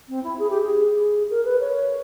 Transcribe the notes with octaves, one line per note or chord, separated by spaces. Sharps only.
C4
E4
G#4
G4
G#4
A#4
B4
C#5